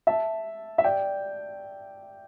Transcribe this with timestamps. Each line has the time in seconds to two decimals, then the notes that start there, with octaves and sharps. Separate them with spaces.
0.07 E5 A5
0.78 E5
0.84 D5 G5